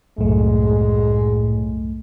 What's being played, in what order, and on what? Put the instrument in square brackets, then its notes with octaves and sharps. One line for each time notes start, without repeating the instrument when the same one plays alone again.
[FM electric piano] C2 F#2 A3 [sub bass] A2 [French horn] G#3